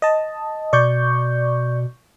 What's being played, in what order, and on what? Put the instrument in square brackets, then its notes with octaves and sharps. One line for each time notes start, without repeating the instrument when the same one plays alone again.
[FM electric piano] D#5 A5
[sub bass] B2 [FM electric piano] D5 C#6 G6